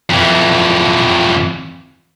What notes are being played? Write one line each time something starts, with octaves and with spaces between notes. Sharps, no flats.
F2 E3